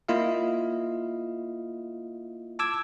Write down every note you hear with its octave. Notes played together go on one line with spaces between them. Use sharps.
A#3 E4 F4 D#5 F5
A5 D6 E6 G#6